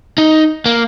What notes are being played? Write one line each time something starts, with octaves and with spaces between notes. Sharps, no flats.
D#4
A#3